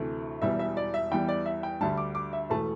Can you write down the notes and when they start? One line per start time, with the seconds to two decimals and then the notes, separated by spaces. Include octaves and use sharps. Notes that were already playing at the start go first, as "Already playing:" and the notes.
Already playing: D2 C3 E3 A3
0.42 E1 E2 E3 G3 E5
0.59 E5
0.77 D5
0.94 E5
1.11 E2 E3 G3 G5
1.29 D5
1.46 E5
1.63 G5
1.81 D2 D3 G3 A5
1.97 D6
2.15 D6
2.33 E5
2.50 E1 E3 A3 A5